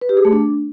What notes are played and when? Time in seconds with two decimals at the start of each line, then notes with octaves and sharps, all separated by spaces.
0.01 B4
0.09 G4
0.17 G#4
0.25 A3
0.33 D4